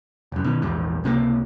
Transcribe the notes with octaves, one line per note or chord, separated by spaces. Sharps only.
F1 F#2
B2 D#3
A#1 E2 G#2
C#2 C3 D#3 A#3